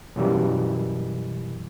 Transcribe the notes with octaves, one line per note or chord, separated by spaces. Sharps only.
F#2 B2 E3 G3